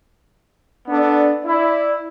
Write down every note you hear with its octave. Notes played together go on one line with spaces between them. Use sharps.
B3 D4 A4 D5
E4 D5